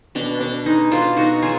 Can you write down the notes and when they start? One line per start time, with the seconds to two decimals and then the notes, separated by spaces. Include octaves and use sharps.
0.15 B2 D4
0.40 B2 D4
0.66 G#3 D#4
0.91 B2 D4 F4
1.17 B2 D#4 F#4
1.42 F#3 F4 G#4